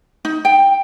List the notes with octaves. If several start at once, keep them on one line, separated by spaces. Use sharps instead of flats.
D#4
G5